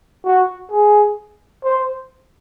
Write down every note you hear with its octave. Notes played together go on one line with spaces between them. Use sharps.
F#4
G#4
C5